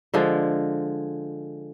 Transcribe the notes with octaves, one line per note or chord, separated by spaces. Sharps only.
D3 F3 G#3